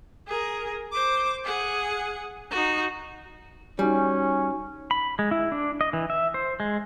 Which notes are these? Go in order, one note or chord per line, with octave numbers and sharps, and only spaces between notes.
G#4 A#4
C5 D6
G#4 F#5
D#4 F#4
G3 C#4 D#4 F#4 G#5
B5
G#3
E4
D4
D#5
E3
E5
C5
G#3